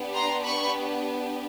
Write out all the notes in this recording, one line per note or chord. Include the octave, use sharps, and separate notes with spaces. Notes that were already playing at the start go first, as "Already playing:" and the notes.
Already playing: B3 D4 G4
A#5 C6
B5 C#6